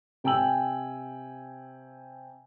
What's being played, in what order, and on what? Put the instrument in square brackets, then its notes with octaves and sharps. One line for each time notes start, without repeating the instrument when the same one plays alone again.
[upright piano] C3 G5 G#5 E6 F#7